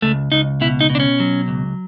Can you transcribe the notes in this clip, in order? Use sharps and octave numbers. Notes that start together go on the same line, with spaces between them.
C#2 A3
C#2 D#4
B2 E4
D#4
B2
D4
C#4
F#3
C#2